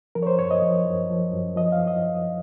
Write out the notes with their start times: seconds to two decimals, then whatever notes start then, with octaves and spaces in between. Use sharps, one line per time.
0.15 F3 A#4
0.23 C#5
0.27 C5
0.39 F#2 C#5
0.51 D#5
0.62 F3
0.86 F#2
1.10 F3
1.33 F#2
1.56 F3 D#5
1.72 F5
1.87 D#5